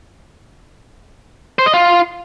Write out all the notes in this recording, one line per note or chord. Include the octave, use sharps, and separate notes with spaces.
C5
D#5
F4